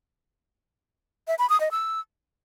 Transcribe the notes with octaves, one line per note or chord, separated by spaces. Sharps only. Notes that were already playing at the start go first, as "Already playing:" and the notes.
E5
B5
D#6
D#5
E6